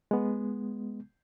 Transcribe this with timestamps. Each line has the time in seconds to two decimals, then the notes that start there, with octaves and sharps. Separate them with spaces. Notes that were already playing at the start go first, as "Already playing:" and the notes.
0.11 G#3 B3